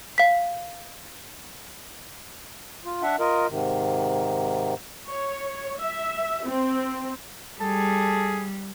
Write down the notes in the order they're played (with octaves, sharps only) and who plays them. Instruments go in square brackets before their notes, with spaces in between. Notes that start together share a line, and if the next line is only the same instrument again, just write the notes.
[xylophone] F5 B6
[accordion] F4
D4 E5 F#5
F4 A#4 D#5
G#2 C3 D#3
[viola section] C#5
E5
C4
[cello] G3 [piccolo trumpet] G#4 [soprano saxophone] A4